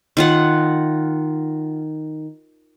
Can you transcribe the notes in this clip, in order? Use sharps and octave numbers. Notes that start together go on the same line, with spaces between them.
D#3 F4 F#5